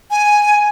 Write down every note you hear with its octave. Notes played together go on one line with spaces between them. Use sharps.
G#5